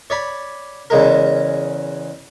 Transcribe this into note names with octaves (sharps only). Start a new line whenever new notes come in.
C#5 D5 B5
E2 C#3 G#3 A#4